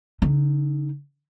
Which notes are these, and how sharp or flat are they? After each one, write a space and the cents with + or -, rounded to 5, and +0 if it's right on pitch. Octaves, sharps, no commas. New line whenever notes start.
D3 -45 D#4 +0